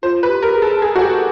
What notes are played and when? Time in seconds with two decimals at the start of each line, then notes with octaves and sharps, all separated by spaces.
0.03 F4 C5
0.23 B4
0.29 G4
0.42 A#4
0.55 G#4
0.62 A4
0.81 G#4 A4
0.95 F#4
1.02 G4